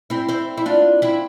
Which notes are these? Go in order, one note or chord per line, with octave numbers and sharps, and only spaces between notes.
C4 E4
C4 E4
E4
D4 F4
C4 E4